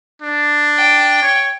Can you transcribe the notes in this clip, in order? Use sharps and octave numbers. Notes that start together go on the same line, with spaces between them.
D4
G5
C#5